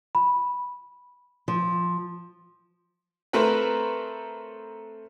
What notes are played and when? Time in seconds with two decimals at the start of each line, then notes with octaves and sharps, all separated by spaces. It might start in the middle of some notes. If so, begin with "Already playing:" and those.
0.15 B5
1.48 F3
3.33 A3 C4 A#4 B4